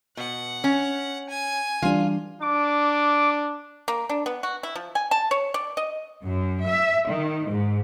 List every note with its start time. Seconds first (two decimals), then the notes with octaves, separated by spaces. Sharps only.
0.17 B2 F#5
0.64 C#4
1.29 G#5
1.82 E3 G3 D4 F4
2.42 D4 D6
3.88 A#3
4.09 D4
4.26 B3
4.43 F#4
4.63 E4
4.76 F3
4.95 G#5
5.11 A5
5.31 C#5
5.54 D5
5.77 D#5
6.24 F#2
6.66 E5
7.09 D#3
7.49 G#2